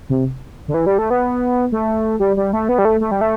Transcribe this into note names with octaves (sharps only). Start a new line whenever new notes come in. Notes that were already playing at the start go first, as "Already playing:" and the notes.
C3
D3
E3
G3
A3
B3
A3
G3
G3
A3
B3
G3
A3
A3
G3
A3